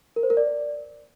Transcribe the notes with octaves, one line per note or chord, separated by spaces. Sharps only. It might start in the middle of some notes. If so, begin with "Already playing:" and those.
A#4
C5
A#4
D5